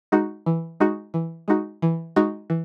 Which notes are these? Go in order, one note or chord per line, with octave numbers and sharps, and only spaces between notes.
G#3 D#4 F#4
E3
G#3 D#4 F#4
E3
G#3 D#4 F#4
E3
G#3 D#4 F#4
E3